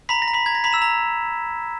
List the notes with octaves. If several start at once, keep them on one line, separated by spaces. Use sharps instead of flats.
A#5 B5 B6
A#6
A#5
B5 B6
A#5 G#6
A#6
A#5 B5 B6
E6 E7
A#5